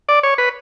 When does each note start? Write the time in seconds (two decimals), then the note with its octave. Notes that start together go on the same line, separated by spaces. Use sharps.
0.09 D5
0.23 C#5
0.38 B4